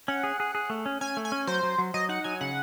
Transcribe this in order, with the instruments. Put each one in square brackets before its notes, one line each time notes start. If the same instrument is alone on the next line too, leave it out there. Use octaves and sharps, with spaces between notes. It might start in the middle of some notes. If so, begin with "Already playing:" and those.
[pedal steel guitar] C#4 [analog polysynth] F#5
[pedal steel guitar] G#4
G#4
G#4
A3
C#4
[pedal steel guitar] C#4 [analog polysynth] G#5
[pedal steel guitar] A3
[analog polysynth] G#5
[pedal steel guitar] C#4
[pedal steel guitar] F#3 [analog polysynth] C5
[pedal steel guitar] F#3
F#3
[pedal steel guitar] F#3 [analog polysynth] D#5
[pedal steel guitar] D#4 [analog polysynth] F#5
[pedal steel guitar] F#3 [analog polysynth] G#5
[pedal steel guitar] C#3 [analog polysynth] F#5